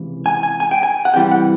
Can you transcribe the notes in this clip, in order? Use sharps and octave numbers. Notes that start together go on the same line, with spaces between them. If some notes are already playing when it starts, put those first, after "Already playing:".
Already playing: C#2 C3 E3
G#5
G#5
G#5
G5
G#5
F#5
C#2 C3 E3 G3 G5
F#5